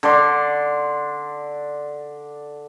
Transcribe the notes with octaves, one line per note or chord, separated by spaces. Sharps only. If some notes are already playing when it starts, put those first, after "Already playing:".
D3 D5 C6